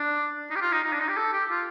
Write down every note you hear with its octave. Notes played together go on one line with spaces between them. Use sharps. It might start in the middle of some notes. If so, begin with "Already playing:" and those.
Already playing: D4
D#4
G4
F4
D#4
D#4
D4
D#4
G4
A4
G4
F4